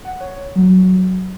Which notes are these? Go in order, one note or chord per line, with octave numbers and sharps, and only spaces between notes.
F#5
C#5
F#3
F#3